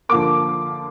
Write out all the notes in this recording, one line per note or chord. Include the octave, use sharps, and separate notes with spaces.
D3 F3 A#3 D6